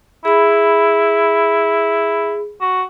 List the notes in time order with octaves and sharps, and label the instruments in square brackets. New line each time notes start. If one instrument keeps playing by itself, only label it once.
[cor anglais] E4 [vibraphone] G#4 B5
[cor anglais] F#4